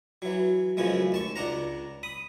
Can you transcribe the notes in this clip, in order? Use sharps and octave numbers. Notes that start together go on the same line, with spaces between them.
E3 F#3
F#2 C#3 E3 F3 G#3 A3
D#2 A5 C#6
C#2 D4 F#5 A#5
B5 D#6